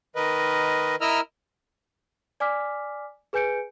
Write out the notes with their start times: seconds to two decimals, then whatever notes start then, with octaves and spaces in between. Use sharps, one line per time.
0.16 D#3 A#4 B4 D#5
1.01 E4 A#4 D#5 A#5 E6 F6
2.40 D5 G#5 D6 F6 B6
3.33 G#4 B4 G#5 G6 C#7 D7